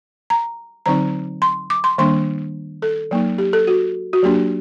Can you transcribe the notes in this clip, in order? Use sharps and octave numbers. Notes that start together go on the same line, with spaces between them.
A#5
D3 F#3 C4 D#4 A#5
C6
D6
C6
D#3 G3 A#3 D4 C6
A4
F#3 A#3 D#4
G4
A4
F#4
F#4
F#3 A#3 D4 G4